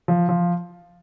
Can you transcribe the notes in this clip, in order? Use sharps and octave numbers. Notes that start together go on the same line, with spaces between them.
F3
F3